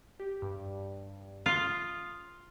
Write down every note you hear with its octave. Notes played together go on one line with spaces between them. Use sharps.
G4
G2
F4 D#6